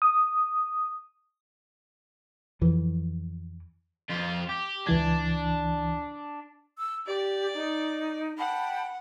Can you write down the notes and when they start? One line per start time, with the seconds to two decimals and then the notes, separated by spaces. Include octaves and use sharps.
0.02 D#6
2.61 F2 E3
4.09 F2 F4
4.49 G4
4.87 C#2 E3 D4 G#6
6.78 E6
7.06 G4 D5
7.53 D#4
8.38 F#5 G5 A5 B5